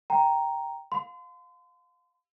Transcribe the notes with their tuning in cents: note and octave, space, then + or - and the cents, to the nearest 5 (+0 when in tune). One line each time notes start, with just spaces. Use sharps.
G5 +0 A#5 +0
F5 +25 C6 -35